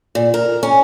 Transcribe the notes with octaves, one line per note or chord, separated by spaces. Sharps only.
A#2
A#4
C#4